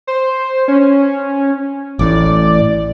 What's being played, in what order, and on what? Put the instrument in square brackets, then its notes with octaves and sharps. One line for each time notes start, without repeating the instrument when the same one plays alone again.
[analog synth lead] C5
C#4
[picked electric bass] A1 A2 [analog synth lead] D5